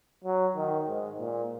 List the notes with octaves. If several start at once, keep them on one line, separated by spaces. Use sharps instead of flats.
F#3
D#3
G#2
A#2